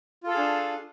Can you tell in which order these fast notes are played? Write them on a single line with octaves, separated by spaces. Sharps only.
F4 A4 F5 G#4 D4